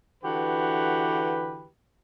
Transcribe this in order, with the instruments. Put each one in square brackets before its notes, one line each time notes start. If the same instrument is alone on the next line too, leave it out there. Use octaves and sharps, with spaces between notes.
[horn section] D3 E3 F#4 G4 B4